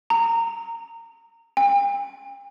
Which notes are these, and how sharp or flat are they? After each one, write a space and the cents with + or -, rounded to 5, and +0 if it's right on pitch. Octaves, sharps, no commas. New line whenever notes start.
A#5 -25
G5 +45